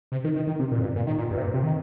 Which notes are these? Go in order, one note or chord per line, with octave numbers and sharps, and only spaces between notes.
C3
D#3
D#3
D#3
C3
A#2
F2
G2
A#2
D#3
A#2
G2
C3
A#2
C3
D#3